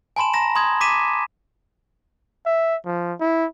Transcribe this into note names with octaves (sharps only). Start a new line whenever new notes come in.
G#5 A5 B5 C6 E7
A#5 A#6 E7
B5 C6 D#6 G#6
D6 B6 D#7 E7
E5
F3
E4